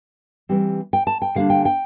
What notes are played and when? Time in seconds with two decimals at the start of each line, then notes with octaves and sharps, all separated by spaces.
0.49 E3 G3 C4
0.93 G5
1.07 A5
1.22 G5
1.35 D3 G3 A#3 D4 F5
1.50 G5
1.65 G5